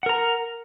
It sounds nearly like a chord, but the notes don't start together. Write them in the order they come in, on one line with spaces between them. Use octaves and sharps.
F#5 A#4 A#5